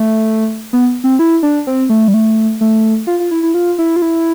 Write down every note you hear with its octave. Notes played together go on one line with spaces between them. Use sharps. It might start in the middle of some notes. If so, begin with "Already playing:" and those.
Already playing: A3
B3
C4
E4
D4
C4
A3
G3
A3
A3
F4
F4
E4
E4
F4
E4
F4
E4